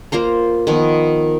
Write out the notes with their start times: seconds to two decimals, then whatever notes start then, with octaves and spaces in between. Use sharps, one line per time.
0.12 A#3 F4 C5 A#5
0.67 D#3 F3 B3